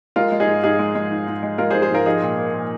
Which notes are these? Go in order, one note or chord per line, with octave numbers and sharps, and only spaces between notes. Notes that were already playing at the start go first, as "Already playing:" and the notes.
G#3 F4 A#4
G#3
D#4 G#4
G#2
G#2 D#4 G#4
G#3
G#3
G#2
G#2
G#3
G#3 F4 A#4
G#4 C5
G#2
G#4 C5
G#2 F4 A#4
F3 D#4 G#4
A#2
A#3
A#2